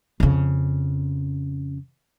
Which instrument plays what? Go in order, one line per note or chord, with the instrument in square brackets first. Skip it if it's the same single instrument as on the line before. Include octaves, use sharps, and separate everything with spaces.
[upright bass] F2 C#3